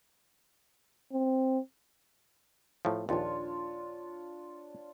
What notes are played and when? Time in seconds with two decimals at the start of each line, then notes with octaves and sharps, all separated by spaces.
1.12 C4
2.85 A2 F3
3.09 A#1 D#2 D4 F4 C#5